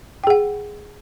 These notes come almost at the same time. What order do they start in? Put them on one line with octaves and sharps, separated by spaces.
G5 G#4 F#5